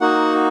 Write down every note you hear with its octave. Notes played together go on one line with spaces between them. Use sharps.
A#3 D#4 F#4 F#5